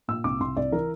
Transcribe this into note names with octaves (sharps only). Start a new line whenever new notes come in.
A#2 E6
C2 D6
C2 C6
C2 D5
E3 A#4